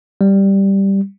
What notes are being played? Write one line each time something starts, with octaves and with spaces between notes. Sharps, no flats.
G3